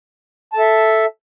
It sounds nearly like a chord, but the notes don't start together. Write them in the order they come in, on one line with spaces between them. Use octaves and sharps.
A5 A4 E5